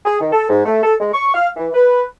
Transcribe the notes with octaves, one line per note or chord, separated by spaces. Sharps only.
G#4
D#3
A4
G#2
A3
A4
G#3
C#6
F5
E3
B4